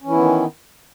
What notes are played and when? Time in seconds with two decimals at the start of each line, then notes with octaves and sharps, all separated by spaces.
0.02 C#4
0.06 E3
0.10 E4
0.13 B3
0.17 D#3